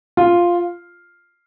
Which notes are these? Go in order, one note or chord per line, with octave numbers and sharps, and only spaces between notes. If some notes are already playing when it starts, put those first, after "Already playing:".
F4